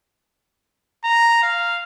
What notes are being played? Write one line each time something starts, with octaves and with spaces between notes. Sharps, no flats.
A#5
F5